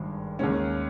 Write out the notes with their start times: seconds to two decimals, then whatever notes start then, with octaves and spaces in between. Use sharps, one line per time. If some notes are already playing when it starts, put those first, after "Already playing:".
Already playing: G#1 G2 D#3 G#3
0.39 D#2 D#3 G#3 C#4